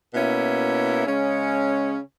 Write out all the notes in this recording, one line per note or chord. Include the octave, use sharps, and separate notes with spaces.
B2 A#3 C#4 E4
C#3 G#3 C#4